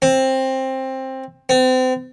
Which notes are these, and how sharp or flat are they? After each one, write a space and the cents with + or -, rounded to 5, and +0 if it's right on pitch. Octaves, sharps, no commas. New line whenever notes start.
C4 +15
C4 -35